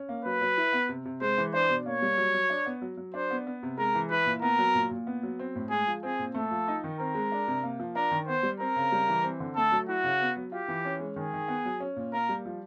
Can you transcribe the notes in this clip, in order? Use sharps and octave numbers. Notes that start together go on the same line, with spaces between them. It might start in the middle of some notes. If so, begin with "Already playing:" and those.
Already playing: C#4
A#3
F#3 B4
F#3
E4
B3
C3
C3
G#3 C5
E3
D4 C5
B2
A#3 C#5
G3
F#3
F#3
D4
B3
F#3
F#3
D4 C5
B3
B3
C3
G#3 A#4
E3
E4 B4
A#2
B3 A#4
F#3
A#2
A#2
B3
F#3
C4
A2
G#3 G#4
F3
C4 G#4
A#2
A3 A4
F3
D#4
D#3
C4 A#4
G#3
D4
C3
A#3
F3
D4 A#4
D#3
B3 C5
G3
C4 A#4
C#3
G3
E3
C4
D3
A3 A4
F#3
E4 F#4
C#3
B3
F#3
F4 G4
E3
C#4
G#3
D#3 G#4
D#3
B3
F#3
C#4
A#2
A#3 A#4
G3
F3